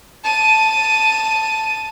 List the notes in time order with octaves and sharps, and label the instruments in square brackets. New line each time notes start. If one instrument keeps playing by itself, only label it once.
[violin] A5 D#7